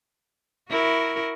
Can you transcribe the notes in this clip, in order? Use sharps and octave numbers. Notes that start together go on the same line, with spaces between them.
E4 F#4 A#4